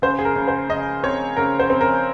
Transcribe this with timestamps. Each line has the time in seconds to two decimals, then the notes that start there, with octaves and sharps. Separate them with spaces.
0.02 C#3 C5
0.19 G#4
0.25 A#4
0.36 C#3
0.48 C5
0.69 C#3 D#5
1.03 C4 C#5
1.37 C#3 A#4
1.59 C5
1.70 C4
1.81 A#4